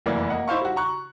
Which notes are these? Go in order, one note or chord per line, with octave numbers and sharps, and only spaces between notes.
F1 F#2 E3 A#3 D5
A#3 D#5 F#5
D#4 E4 C5 F5 C#6
G3 F#4
A#5 C#6 F#6